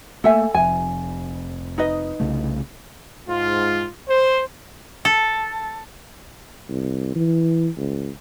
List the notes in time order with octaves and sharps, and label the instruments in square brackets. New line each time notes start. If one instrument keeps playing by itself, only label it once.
[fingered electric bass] A3 A#3 [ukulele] A4 E5 G#5
[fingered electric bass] F1 F2 [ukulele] G#5
[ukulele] D#4 B4 D#5
[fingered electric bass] C2 C#3 A3
[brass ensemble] G#2 F4
C5
[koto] A4
[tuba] C2
E3
C#2